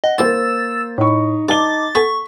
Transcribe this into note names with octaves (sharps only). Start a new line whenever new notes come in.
D#5 F#5
C2 E3 A#3 C4 A#4 C5 E6 A6
A2 D#4 B5 C#6
G2 D#4 A5 D6 A6 G7
B3 A4 G#5 C#6 B6